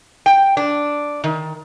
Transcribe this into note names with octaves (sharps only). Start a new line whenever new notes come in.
G5
D4
D#3